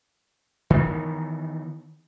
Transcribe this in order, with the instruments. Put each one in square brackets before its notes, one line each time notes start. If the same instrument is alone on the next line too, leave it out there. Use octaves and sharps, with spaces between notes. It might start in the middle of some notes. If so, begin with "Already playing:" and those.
[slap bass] D#3 E3 B3